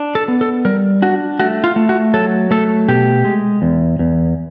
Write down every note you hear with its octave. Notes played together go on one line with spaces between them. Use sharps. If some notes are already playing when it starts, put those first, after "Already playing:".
Already playing: D4
A4
B3
A4
G3 A#4
D4 F#4
A3 F#4
F4
A3
F#4
F#3 A4
A3 A4
B2 G4
G#3
E2
E2